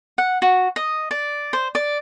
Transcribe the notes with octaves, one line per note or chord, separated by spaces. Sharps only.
F#5
F#4
D#5
D5
C5
D5